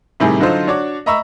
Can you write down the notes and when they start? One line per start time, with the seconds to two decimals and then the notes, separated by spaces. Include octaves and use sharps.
0.20 A2 C3 D#3 G3 E4 G#4
0.40 D3 F#3 D#4 F4 A4 C5
0.67 D4 F#4 C#5 D5
1.06 D#5 E5 A#5 B5 C#6 E6